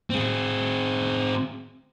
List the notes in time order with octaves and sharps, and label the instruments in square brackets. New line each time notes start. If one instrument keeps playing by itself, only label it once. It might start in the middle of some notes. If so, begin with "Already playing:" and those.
[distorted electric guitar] C4 G#4